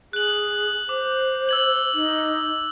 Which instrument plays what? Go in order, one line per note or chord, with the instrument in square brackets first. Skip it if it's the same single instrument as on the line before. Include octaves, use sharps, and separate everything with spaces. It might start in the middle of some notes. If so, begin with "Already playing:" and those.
[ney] G#4 [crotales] F#6 F#7
[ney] C5 [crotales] D6
[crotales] E6 G#6 F#7
[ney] D#4